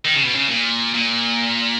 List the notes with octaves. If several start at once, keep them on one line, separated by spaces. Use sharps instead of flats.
D#3
C#3
B2
C#3
A#2
A#2